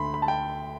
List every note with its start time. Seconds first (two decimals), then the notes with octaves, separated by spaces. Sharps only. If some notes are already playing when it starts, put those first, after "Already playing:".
Already playing: D2 D3 B5 C6
0.14 B5
0.22 A5
0.28 G5